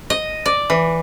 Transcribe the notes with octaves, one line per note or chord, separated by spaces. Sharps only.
D#5
D5
E3